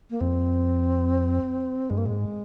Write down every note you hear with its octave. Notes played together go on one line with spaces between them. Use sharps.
A#3
F2 C4
G2 G#3
A#3
A#2 G#3
G#2